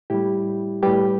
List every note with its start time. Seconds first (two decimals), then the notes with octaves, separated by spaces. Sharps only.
0.10 A2 G3 E4 G4
0.83 A2 G3 G4 B4